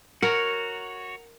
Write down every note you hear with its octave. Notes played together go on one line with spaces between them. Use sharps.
F#4 A#4 C#5 F#5 A#5